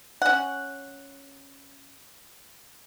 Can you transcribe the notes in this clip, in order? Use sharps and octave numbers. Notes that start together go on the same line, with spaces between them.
C#4 F#5